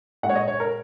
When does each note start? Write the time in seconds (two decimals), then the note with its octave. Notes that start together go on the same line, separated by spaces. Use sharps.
0.23 A#2 G#3 F#5
0.29 C#5
0.35 D#5
0.48 C#5
0.60 A#4